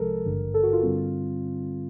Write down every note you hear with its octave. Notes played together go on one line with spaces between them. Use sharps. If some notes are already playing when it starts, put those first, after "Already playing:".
Already playing: C2 C3 F3 G#3 A4 A#4
G#1 G2 D3
A4
F#4
F4
G2 D3 G3 C4